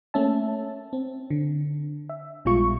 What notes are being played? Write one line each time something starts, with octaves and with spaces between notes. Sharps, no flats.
A3 A#3 C#4 E5 A5
C4
D3
E5
A#1 B2 G3 G#3 F4 C#6